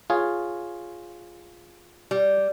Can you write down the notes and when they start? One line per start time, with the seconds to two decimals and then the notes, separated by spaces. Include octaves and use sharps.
0.10 F4 G#4 C#5
2.11 G3